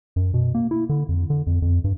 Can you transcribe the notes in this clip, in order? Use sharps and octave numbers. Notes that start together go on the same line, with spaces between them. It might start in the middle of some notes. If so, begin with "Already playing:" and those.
F#2
B2
A#3
E4
D3
F2
D3
F2
F2
G2